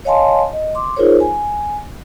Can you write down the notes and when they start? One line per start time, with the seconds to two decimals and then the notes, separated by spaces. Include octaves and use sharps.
0.05 C#5 D#5 F5 G#5 A5 C6
0.53 D#5
0.75 C6 D6
0.96 D#4 F4 G#4 A#4 C5 C#5
1.20 G#5